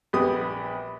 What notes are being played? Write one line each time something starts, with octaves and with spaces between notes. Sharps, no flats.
A#1 G3 B3 G4 D#6